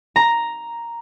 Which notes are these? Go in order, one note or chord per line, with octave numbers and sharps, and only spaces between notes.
A#5